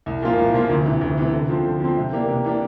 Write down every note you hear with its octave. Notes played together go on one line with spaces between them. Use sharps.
C2
A#2 F3 A#3 F4
C2
A#2 F3 A#3 F4
D2
C3 E3
D2
C3 E3
D3
F3 C4
D3
F3 C4
C3
E3 A#3 D4 G4
C3
E3 A#3 D4 G4